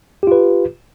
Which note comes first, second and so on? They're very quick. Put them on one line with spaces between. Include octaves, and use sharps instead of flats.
G4 F4 B4